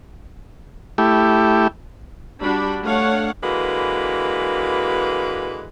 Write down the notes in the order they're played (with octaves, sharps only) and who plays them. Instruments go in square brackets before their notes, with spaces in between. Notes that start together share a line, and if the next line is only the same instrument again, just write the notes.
[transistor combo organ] A3 E4 G4
[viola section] G3 D4 F#4 B5
A3 D4 C#5 F5 F#5
[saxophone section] D3 E3 G#3 A#3 F#4 B4